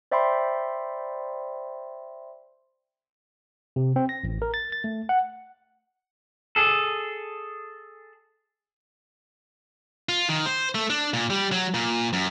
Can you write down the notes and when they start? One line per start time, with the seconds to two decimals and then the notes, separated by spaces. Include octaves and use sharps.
0.12 C5 D5 E5 G5 B5 C6
3.76 C3
3.96 C4
4.09 A#6
4.24 A1
4.42 A#4
4.54 A6
4.72 A6
4.84 A3
5.09 F#5
6.56 G#4 A4
10.09 F4
10.29 D#3
10.46 C5
10.75 A3
10.90 D4
11.14 A#2
11.30 G3
11.52 F#3
11.74 A#2
12.13 F#2